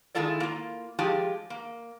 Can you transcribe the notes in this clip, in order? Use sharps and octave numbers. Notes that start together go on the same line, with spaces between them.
D#3 G#3 E4 F4 A4 D5
A#3 F4
F3 G#3 F4 G4
A#3